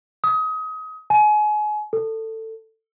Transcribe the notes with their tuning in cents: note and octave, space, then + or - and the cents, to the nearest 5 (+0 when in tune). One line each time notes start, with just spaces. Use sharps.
D#6 +25
G#5 +30
A4 +15